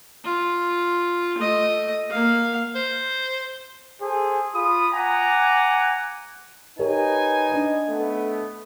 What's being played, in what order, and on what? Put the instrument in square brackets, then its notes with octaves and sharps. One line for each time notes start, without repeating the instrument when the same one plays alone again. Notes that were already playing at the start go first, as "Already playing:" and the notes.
[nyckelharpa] F4
A3 D#5
A#3 F5
[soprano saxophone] C5
[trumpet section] G#4 A4 C5
F4 B5 D#6
F#5 G#5 A#5 D6
[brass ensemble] D#4 B4 G#5 [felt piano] G4 A#4 C#5
[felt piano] D4 D#5
[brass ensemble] A3 B3